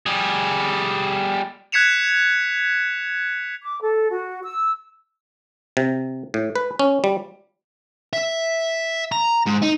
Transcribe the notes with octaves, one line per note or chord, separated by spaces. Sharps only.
G3 G#4
F#6 G#6 B6 C#7 E7 F7
D6
A4
F#4
E6
C3
A2
B4
C#4
G3
E5
A#5
G#2
D#4